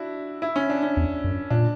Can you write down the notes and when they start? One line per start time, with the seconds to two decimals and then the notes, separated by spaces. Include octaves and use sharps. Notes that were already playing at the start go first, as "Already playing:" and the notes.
Already playing: D4 E4 F#4
0.42 E4
0.56 C#4
0.70 D4
0.83 C#4
0.97 E2
1.24 F#2
1.50 A#2 D4